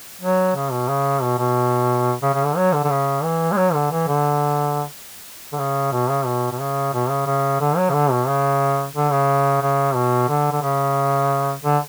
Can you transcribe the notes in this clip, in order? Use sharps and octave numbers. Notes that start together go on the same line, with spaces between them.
F#3
C#3
B2
C#3
B2
B2
C#3
C#3
D3
F#3
D3
D3
C#3
E3
G#3
F#3
D3
E3
D3
D3
C#3
B2
C#3
B2
B2
C#3
B2
C#3
C#3
D3
F#3
C#3
D3
B2
C#3
D3
C#3
C#3
B2
D3
D3
C#3
D3